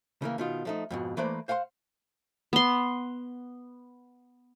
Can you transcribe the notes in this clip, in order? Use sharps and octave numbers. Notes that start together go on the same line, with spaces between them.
C#3 E3 A#3
B2 D#3 F4
F3 A3 D#4
F2 G#2 B2
E3 A3 A#3 B4 C5 D5
C5 F5 F#5 G#5 C6
B3 C6